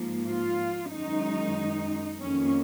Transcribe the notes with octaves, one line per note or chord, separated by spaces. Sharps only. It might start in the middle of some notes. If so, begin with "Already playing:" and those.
Already playing: G#2 F3 A#3
F4
F#2 D#3 G#3 D#4
F2 D#3 A#3 C#4